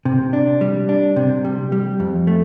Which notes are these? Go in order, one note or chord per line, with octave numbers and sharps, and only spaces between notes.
C3
D4
G3
D4
C3
G3
G3
F2
A3